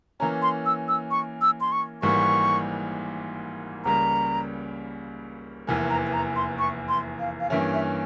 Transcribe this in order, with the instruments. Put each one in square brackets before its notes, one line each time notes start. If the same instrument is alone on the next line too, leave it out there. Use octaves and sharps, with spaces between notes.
[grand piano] E3 A#3 C#4 [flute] A#5
[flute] C6
E6
E6
C#6
E6
C6
C#6
[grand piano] G#1 G#2 E3 G3 A#3 [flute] C#6
[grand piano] C#2 C#3 G3 A#3 [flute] A#5
[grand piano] F1 E2 E3 A#3 [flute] G#5
[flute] A#5
G#5
A#5
C6
C#6
C6
F5
F5
[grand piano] G2 E3 A#3 C#4 [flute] E5
[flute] E5